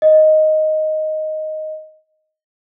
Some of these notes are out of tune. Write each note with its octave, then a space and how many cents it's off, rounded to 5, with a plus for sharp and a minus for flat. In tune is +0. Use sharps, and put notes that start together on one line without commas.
D#5 +0